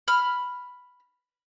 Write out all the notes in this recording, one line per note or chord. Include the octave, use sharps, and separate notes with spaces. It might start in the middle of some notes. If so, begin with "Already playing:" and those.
B5 F6